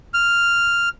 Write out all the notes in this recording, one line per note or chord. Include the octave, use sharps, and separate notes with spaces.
F6